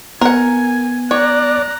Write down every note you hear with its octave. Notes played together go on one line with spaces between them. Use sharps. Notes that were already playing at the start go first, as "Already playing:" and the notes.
B3 A#4 F#5 G#5
C#5 D5 A#5 F#6